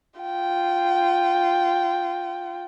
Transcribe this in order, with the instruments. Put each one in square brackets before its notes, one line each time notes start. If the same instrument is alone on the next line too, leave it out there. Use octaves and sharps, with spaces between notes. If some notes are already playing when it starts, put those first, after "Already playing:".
[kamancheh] F4 G5